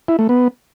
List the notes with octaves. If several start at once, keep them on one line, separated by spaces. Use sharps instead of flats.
E4
A3
B3